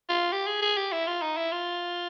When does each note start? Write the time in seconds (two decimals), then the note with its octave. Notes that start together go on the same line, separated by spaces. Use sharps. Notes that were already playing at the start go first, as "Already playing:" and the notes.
0.09 F4
0.32 G4
0.47 G#4
0.62 G#4
0.77 G4
0.92 E4
1.07 F4
1.22 D#4
1.37 E4
1.52 F4